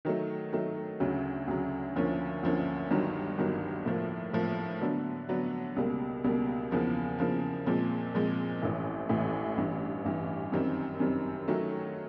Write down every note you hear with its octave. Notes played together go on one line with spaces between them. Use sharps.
D#3 F#3 A3
D#3 F#3 A3
D2 C#3 F#3
D2 C#3 F#3
D2 D3 F3 A#3 C#4
D2 D3 F3 A#3 C#4
G1 G2 D#3 F#3
G1 G2 D#3 F#3
A2 F3 A#3
A2 F3 A#3
D3 F#3 B3 D4
D3 F#3 B3 D4
C#2 B2 G3 A#3
C#2 B2 G3 A#3
E2 C#3 F3 A#3
E2 C#3 F3 A#3
A#2 F3 G#3 C4
A#2 F3 G#3 C4
A1 A2 E3
A1 A2 E3
A1 G2 E3
A1 G2 E3
F#2 D#3 G3 C4
F#2 D#3 G3 C4
D#3 F#3 A3 C#4